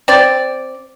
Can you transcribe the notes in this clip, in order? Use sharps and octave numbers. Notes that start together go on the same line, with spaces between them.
C4 D5